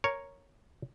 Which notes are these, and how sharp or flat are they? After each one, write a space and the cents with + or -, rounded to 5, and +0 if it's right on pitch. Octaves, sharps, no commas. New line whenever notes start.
A#4 +0 C#5 +0